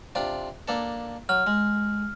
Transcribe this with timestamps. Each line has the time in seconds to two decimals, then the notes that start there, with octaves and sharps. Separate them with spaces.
0.15 C3 D4 F4
0.68 A#3 D4 A4
1.29 F#3 F6
1.47 G#3